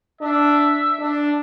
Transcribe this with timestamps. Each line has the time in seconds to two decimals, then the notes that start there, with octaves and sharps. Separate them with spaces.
0.22 D4 E5
0.99 D4